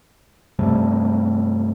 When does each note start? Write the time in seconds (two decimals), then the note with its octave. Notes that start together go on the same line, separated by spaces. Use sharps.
0.59 G2 C3 G3 A3